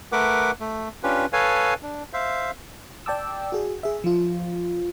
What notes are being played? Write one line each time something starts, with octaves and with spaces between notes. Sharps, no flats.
A3 A#4 B4 F#5 D6
A3
C#4 D4 F4 G4 B4
A4 B4 C#5 F5 G#5
D4
C5 E5 F5
D5 G5 A5 D6 E6
F#4 G#4
G#4 E5
F3 F4